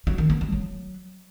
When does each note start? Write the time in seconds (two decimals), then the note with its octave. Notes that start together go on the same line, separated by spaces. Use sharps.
0.07 F#3
0.18 D#3
0.30 B3
0.41 G3
0.52 F#3